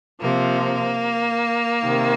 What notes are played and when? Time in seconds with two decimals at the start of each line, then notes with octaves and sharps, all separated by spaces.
0.21 C3 F3 A#3
1.82 C3 D#3